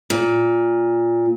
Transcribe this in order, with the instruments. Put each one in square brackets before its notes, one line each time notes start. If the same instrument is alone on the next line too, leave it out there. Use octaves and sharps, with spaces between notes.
[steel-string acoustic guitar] A#2